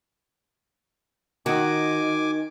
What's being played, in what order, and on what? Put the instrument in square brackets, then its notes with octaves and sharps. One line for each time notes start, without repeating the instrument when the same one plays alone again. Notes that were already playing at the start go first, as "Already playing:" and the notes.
[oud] D#3 [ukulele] D#4 F#4 [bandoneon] G#5 D6